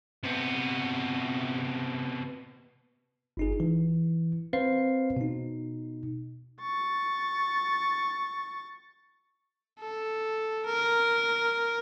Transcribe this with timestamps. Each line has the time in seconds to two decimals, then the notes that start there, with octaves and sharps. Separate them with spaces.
0.23 C3 B3
3.37 G1 D#4 G#4
3.60 E3
4.53 C4 B4 C5 F5 C7
5.17 B2 D#4
6.61 C#6 A6
9.80 A4
10.66 A#4